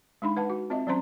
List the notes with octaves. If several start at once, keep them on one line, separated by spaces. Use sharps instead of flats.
G#3 D4 D#4 B5
B4 F#5 A5
F#4
C4 F4 D#5 E5
F#3 C4 C#4 C5 A#5 C6